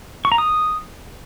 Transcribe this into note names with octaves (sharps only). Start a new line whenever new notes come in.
C#6
A#5
D#6